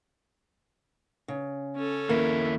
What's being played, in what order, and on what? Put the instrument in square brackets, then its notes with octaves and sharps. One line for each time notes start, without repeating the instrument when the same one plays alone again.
[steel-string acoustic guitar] C#3
[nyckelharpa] C#4 A4
[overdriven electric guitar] D#2 E4 [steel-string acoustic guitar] A#3